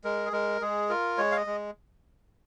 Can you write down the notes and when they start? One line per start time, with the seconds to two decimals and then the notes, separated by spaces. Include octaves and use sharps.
0.04 G#3 A#4
0.26 G#4
0.32 G#3 A#4
0.61 G#3 G#4
0.89 F4 A#4
1.18 G#3 C#5
1.32 F5
1.37 D#5
1.46 G#3